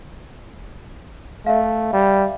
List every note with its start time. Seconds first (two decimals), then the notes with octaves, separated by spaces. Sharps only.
1.46 A3 E5 F5
1.93 G3